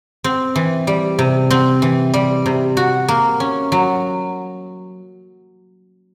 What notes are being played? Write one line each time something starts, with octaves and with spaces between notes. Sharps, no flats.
C4
E3
G3
C3
C4
E3
G3
C3
F#4
A#3
C#4
F#3